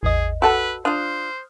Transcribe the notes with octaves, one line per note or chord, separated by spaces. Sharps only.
A1 E2 G#4 D#5
F#4 A4 B4 A5 E6
D4 F4 C5 D#6 F6 F#6